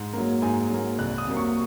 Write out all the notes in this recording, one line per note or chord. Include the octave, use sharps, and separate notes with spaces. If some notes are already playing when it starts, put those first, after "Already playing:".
Already playing: G#2
F#3 A#3
G#2 G#5
F#3 A#3
C2 F#6
D#6
C3 F#3 A#3
C#6